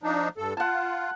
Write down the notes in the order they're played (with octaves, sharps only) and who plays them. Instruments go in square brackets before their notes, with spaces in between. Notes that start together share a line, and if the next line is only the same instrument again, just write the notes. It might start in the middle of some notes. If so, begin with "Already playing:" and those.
[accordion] F3 D4 D#4
G2 A4
[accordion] F4 [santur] F#5 A5